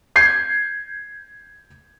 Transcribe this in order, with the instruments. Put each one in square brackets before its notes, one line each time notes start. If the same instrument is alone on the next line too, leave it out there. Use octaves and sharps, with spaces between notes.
[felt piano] G6 G#6 C7